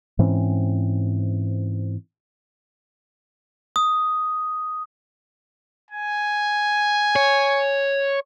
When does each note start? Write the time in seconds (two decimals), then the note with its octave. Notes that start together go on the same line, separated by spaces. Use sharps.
0.19 G#2 E3 C4 C#4
3.76 D#6
5.91 G#5
7.16 C#5